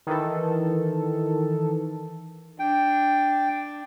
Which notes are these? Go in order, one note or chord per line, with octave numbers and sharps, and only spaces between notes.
D#3 E3 A4
D4 G5